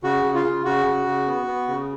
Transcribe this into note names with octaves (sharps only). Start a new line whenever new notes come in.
C#3 F#4
C#3
F4
C#3
C#3 F#4
C#3
C#3
B3
B3
C#3